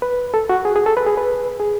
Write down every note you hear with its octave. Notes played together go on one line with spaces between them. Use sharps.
B4
A4
F#4
G#4
G#4
A4
B4
G#4
B4
G#4